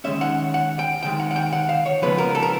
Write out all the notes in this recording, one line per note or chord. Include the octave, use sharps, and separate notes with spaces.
D#3 G#3 C#4 E5
F#5
F#5
G5
C3 D#3 G#3 G5
F#5
F#5
G5
F#5
F5
C#5
C#3 F3 G#3 B3 B4
A#4
A4
A#4